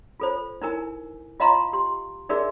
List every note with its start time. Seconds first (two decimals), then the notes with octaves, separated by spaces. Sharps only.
0.20 F4 A4 C5
0.62 D#4 E4 A#4 G#5
1.40 F4 D#5 F5 A#5 C6
1.73 G4 C6
2.29 D#4 F#4 G#4 A#4 D5 E5